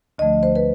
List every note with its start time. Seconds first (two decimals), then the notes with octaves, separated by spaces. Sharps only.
0.18 D2 D3 F3 A3 D#5
0.43 C5
0.56 B4